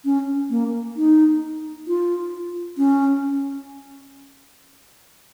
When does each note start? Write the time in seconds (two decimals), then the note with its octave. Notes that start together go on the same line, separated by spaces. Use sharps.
0.05 C#4
0.50 A#3
0.97 D#4
1.87 F4
2.78 C#4